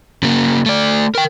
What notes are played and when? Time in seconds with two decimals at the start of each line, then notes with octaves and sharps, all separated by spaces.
0.23 C#3 A#3
0.66 A3 D5
1.15 A#4 G5